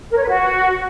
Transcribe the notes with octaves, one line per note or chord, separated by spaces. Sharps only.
A#4
C#5
B4
F#4